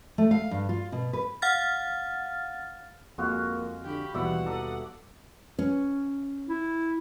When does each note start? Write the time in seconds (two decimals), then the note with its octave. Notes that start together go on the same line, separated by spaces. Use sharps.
0.18 A3
0.31 F5
0.51 G2
0.69 F4
0.92 B2
1.13 B4
1.42 F5 F#5 F6 A6
3.18 F2 G#3 A#3 F#4 F5
3.84 D3 G4 B5
4.14 D#2 B2 E3 G3 D5 E5 F#5 B5
4.46 A4 D5 A#5 D#6
5.59 C#4
6.49 E4